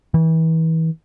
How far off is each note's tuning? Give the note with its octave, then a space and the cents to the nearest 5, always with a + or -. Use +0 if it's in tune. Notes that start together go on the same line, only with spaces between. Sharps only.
E3 -35